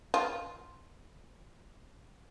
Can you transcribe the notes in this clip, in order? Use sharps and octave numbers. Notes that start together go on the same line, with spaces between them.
F4